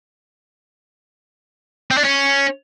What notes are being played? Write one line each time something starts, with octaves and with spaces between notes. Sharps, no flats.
C4
D4
C#4